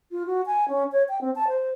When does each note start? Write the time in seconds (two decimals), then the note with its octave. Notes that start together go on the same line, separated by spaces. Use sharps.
0.11 F4
0.26 F#4
0.46 G#5
0.69 C#4
0.92 C#5
1.09 G5
1.21 C4
1.36 A5
1.48 C5